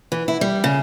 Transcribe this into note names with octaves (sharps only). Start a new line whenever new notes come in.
E3
E4
G3
C#3